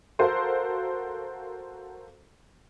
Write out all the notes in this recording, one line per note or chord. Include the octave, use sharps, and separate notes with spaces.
F#4 A4 A#4 C5 F5 C6